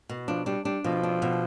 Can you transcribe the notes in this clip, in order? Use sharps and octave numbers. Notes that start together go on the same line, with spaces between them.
B2
F3 D4
G3 D4
G3 D4
B2 F3
D4
B2